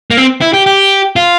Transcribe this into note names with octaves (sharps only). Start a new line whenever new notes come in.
A#3
C4
E4
G4
G4
F4